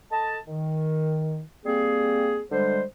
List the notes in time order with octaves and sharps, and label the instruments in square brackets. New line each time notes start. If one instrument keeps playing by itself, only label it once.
[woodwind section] A4 D#5 A5
D#3
G3 A#3 C4 G#4
D3 G3 G#3 C5